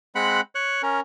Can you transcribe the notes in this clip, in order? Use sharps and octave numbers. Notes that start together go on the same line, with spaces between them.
G#3 C4 F#5 B5 F#6
C#5 F#6
C#4 A#4